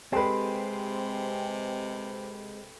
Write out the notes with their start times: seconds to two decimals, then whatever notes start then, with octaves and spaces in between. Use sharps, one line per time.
0.12 C3 G#3 C4 G4 A4 B4